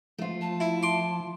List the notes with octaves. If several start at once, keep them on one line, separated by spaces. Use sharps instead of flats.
F3 A3 F4
A5
E4
C6 D6